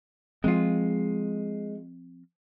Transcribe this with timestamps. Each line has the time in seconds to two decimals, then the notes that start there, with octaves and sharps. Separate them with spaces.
0.44 F3 G#3 C4 F4